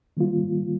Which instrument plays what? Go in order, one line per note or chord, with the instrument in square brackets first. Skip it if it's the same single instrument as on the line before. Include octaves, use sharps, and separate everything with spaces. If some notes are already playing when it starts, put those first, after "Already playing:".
[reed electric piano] D#3 G3 A#3 F4